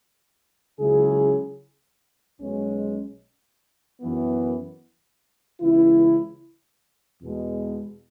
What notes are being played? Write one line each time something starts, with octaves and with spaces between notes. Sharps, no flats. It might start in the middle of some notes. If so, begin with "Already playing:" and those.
C#2 C#3 F#3 E4 G#4
B1 B2 G#3 C#4
F#2 E3 B3
C#2 C#3 E3 B3 E4
E2 B2 G#3